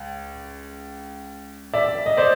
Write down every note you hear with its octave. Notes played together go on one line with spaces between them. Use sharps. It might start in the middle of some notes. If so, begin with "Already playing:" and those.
Already playing: C#2
D5 E5
D#5
C5 D5